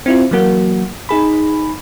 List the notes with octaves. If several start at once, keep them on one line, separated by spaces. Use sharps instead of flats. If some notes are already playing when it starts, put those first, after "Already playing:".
C4 E4 F4
E3 F#3 A#3 F#4
D#4 G#4 B5